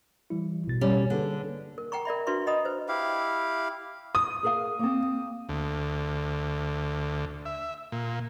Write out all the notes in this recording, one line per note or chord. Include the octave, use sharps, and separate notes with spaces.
E3 G3 E4
A1 B2 A6
G3 C#4
D3 A#3 G#4 B4
A#4
F#5 G5 A#5 C#6
A#4 D5 E5 B5
D4 F#4 B4 E5 C6 C#6
D#5 F#5 A#5 B5 D#6
B4 C5
E4 G4 F5
D#6
G#4 A#4 F5
A#3 C4
D2
E5
A#2